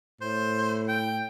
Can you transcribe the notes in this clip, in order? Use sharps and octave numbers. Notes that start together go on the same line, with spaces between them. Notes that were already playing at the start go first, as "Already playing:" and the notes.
A2 C5
G5